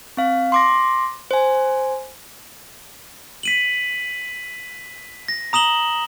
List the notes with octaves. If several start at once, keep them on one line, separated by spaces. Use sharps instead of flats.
C4 F5
C6 D6 A#6
C5 G#5
B6 D#7 F#7
A#6
A#5 D#6 E7 F#7 G7